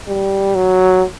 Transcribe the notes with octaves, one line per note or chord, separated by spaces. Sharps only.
G3
F#3